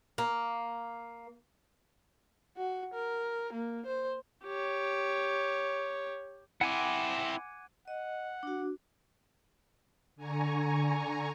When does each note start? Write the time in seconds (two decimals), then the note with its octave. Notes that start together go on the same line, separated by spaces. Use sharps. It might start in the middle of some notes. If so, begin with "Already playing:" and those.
0.18 A#3
2.57 F#4
2.94 A#4
3.53 A#3
3.86 C5
4.45 G4 C#5
6.61 C4 E4 F#5 G#5 D6
7.88 D#5 F#5
8.43 D4 F#4
10.16 D3 G#5 A#5 C#6